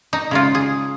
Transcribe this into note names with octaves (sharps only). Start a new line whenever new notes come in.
D#4
C#3 G#3 F4
G#4